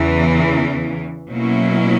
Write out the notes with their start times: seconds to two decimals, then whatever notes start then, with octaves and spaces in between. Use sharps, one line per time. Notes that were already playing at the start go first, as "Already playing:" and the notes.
Already playing: E2 C#3 E3
1.30 B2 F#3 A#3 C#4 E4